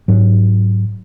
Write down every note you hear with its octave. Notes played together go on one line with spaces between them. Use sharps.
G#2 F#3